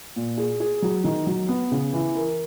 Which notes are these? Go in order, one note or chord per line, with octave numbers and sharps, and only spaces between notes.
A#2
G#4
G#4
F#3
D#3
F#3
B3
C#3
E3
A#4